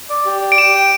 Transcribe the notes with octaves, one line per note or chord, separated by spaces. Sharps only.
D5
G4
D5
D7
G4 E7
G5 D7